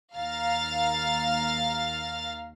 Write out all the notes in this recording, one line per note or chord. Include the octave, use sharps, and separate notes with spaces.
D#2 F5 A#5 F6 A6